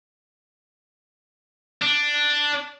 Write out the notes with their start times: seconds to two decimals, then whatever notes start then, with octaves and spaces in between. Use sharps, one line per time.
1.82 D4